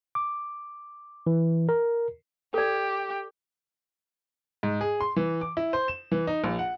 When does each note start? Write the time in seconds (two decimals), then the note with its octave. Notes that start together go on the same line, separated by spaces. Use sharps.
0.15 D6
1.27 E3
1.69 A#4
2.54 G4 A4 D5
4.63 G#2
4.81 G#4
5.00 C6
5.16 E3
5.41 D6
5.57 E4
5.73 C5
5.88 E7
6.12 E3
6.27 D#4
6.44 A#1
6.59 F#5